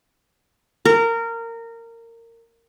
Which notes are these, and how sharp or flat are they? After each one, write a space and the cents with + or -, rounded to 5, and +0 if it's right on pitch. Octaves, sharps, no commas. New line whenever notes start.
A#4 -20